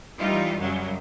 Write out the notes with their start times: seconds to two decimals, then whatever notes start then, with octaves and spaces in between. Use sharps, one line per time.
0.19 E3 G3 D#4 F4
0.58 F#2 C#3 F#3 G3